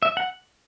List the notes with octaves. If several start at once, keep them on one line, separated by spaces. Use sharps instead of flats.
E5
F#5